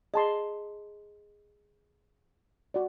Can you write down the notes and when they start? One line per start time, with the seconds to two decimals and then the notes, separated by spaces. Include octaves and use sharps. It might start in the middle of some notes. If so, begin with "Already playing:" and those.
0.14 G#4 D#5 A5 C6
2.74 F#4 D5